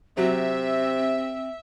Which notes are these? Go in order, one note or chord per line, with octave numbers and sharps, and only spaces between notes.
C3 F#3 C4 E5